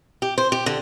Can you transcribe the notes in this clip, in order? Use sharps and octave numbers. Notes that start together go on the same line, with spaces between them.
G4
C5
G4
D3